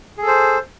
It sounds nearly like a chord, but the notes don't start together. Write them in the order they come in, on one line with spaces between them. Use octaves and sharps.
G#4 A4 C5